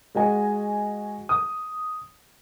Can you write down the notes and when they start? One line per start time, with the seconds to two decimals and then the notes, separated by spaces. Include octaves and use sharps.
0.15 G#3 F#4 D#5 G#5
1.29 D#6